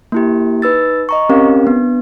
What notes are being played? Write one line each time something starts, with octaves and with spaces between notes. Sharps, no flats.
A#3 E4 G4
D#4 B4 E6 A6
D#5 A#5 C#6
C4 C#4 G4 A#4 F5
B3 D4